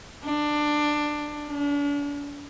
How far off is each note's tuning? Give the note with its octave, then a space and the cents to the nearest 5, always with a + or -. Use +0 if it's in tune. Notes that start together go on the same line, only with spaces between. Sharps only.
D4 +15
D4 -40